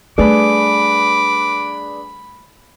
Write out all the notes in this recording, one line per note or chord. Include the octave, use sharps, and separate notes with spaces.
G3 A3 D4 G#4 B4 B5 D6